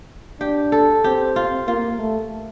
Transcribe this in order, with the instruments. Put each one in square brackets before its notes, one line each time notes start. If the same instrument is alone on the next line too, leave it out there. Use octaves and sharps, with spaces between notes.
[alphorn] D4 [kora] G4
[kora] A4
[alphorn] C4 [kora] G4
[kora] F4
[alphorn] A#3 [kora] F4
[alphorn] A3